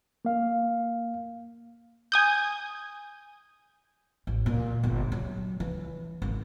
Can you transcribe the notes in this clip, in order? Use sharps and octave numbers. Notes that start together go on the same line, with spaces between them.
A#3 F5
G#5 D#6 G6
A1
A#2
G1
F#3
E3
G#1